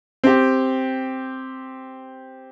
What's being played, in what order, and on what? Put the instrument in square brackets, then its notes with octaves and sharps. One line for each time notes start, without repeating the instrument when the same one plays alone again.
[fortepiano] C4 G4